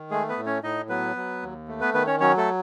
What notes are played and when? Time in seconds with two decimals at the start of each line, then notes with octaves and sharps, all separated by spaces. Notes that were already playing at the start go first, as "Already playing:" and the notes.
Already playing: D#3
0.11 G#3 A3 G#4
0.29 B3 B4
0.37 A2
0.46 C#4 C#5
0.63 A2 D#4 D#5
0.89 F#3 B3 B4
1.16 F#3
1.42 D#2
1.68 A3
1.81 B3 B4
1.94 D#3 B3 B4
2.07 C#4 C#5
2.20 F#3 C#4 C#5
2.37 A3 A4